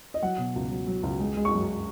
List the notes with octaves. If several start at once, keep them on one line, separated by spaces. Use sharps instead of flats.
D#5
F#3 F#5
B2
C#2
F#3
F#3
C#2
G#3
G#3
C#6
F#2